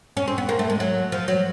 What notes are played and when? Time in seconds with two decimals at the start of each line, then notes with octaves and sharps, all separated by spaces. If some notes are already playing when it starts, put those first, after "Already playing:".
0.17 C#4
0.28 C4
0.38 B3
0.49 A#3
0.59 A3
0.70 G#3
0.80 F#3
1.12 F3
1.28 F#3